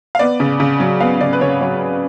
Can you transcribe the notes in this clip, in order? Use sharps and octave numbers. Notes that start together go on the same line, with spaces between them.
F5
B3 D5
C#3
C#3
F#3
B3 F5
C#3 D5
B4
C#3 C#5
F#3 C#5